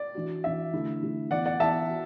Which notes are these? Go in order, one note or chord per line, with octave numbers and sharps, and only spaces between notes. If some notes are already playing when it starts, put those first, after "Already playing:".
Already playing: D5
E3 D4 F#4
E3 D4 F#4 E5
D3 A3 E4
D3 A3 E4
E3 B3 E4 D5 F#5
D5 F#5
E3 B3 E4 E5 A5
F#4